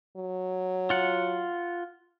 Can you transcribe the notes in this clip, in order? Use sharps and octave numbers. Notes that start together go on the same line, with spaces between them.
F#3
F4 F#5